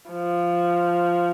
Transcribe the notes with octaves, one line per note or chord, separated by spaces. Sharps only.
F3